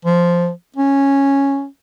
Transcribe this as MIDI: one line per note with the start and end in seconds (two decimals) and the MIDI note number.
0.05 0.50 53
0.76 1.66 61